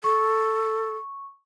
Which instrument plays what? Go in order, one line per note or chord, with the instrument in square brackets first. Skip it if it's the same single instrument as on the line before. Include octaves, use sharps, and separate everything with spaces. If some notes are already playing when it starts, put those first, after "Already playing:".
[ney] A4 [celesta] C#6